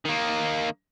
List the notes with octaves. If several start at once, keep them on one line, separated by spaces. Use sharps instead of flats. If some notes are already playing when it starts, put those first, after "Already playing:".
D#3 A#3